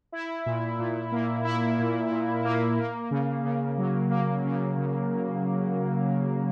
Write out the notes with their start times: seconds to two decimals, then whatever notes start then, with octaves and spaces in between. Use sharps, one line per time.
0.12 E4
0.46 A#2
0.79 A#2
1.12 A#3
1.45 E4
1.79 A#2
2.11 A#2
2.45 A#3
2.78 A#3
3.11 C#3
3.44 C#3
3.78 F#3
4.10 A#3
4.45 C#3
4.77 C#3